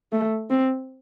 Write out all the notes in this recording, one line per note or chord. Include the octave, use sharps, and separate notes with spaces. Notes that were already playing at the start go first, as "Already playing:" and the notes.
A3
C4